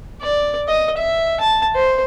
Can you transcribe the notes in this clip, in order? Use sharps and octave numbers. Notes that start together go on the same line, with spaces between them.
D5
D#5
E5
A5
C5